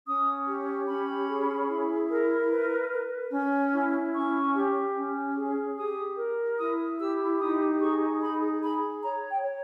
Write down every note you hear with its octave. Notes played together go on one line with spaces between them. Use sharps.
C#4 D#6
G4
C#4 B5
G#4
E4
A#4
B4
B4
C#4
E4
C#4 C#6
G4
C#4
G#4
G4 D#6
A#4
E4 D#6
G4 E6
D#4 D#6
G#4 C#6
D#4 B5
G#4 B5
C#5 A#5
G5
C#5